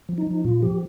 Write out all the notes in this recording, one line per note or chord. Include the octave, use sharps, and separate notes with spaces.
F3
D#4
F3
A#2 F4
F3 G4